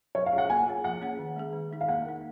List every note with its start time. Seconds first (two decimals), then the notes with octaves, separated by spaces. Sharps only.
0.15 F#3 C#5
0.26 F5
0.32 C#4 F4 G#4
0.38 F#5
0.50 A#3 G#5
0.67 F4 G#4 C#5
0.84 F3 F#5
1.01 A#3 C#4 G#4 C#5
1.19 D#3
1.36 G#3 C#4 G#4
1.53 D#3
1.71 G#3 D#4 G#4
1.81 F5
1.89 A#3 F#5
2.05 D#4 A#4